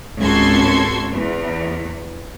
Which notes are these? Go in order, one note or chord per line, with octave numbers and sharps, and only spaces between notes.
G#1 C#2 F#4 A4 C6 G#6
E2